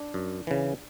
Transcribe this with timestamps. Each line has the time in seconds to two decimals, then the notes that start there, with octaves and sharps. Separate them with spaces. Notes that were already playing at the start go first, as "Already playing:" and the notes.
Already playing: D4
0.14 F#2
0.47 C#3 E3